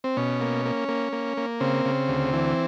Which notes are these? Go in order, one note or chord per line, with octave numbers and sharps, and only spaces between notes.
C4
B2 C#4
A#3
A#3
A#3
A#3
A#3
C#3 C4
C#3
D2
E3